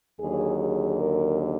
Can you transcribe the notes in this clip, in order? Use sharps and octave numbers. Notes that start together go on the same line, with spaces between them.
D#2 D3 F#3 G#4
G#4
A#4